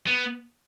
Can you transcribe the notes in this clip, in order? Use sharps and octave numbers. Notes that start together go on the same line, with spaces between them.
B3